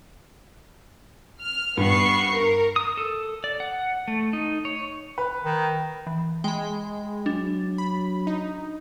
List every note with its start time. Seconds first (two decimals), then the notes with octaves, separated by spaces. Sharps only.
1.40 F6
1.77 G2 B3 C#6 C7
2.32 A#4
2.76 D#6
2.97 A4
3.44 D5
3.60 F#5
4.08 A3
4.33 D#4
4.65 C#5
5.18 B4
5.44 D#3
6.07 E3
6.44 G#3 G5 B5
7.26 F#3 D4
7.78 B5
8.27 D#4